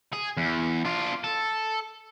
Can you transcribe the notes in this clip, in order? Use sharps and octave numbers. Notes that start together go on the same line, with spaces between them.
G#4
E2
D4 F4
A4